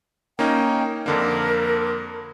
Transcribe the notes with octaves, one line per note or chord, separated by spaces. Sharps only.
A#3 C#4 D#4 G5
F2 D3 A#3 A#4